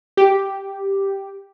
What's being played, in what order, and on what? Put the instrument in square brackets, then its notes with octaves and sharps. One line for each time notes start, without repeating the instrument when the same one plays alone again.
[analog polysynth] G4